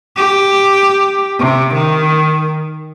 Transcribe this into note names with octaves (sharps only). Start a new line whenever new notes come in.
G4
C3
D#3